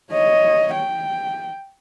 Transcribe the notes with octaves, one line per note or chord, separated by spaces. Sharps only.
C#5 D#5
G5